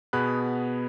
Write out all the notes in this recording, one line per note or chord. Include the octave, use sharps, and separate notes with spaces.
B2 B3 G#4 B5 F#6